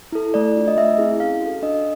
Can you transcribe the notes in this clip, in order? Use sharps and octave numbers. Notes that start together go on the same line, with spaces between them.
E4 A4
A3 D5
D4 F4
D#5
A3 E5
C4 E4 G#4
C#4 F5
F#4
A4
D4 D#5